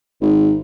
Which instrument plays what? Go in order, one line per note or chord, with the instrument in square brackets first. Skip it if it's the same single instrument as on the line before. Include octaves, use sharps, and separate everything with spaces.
[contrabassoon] G#1